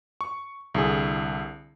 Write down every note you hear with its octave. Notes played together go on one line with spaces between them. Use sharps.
C#6
C2 D3 G#4